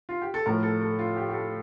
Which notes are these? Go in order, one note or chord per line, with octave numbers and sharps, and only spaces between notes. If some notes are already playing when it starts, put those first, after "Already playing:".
F4
G4
A4
A2 F3 A#4
A4
A4
F4
G4
G4
A4